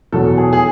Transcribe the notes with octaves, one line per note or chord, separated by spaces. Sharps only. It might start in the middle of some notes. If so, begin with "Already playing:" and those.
E2 B2 F#3 A4
G#4
G#4